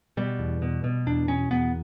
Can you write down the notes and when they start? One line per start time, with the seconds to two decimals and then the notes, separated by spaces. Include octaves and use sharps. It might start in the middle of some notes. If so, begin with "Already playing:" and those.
0.17 B2 G3
0.39 E2
0.62 B2
0.84 B2
1.06 E2 D4
1.28 B2 C#4
1.51 E2 B3